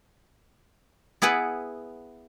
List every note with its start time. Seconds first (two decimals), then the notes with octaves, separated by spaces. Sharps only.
1.22 B3 E4 G#4 B4 F#5